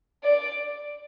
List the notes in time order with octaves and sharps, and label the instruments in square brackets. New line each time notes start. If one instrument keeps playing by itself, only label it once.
[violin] D5